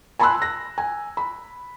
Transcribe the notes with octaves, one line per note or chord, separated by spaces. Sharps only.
G#5 A5 B5 C6 E6 F#6
A#6
G#5
B5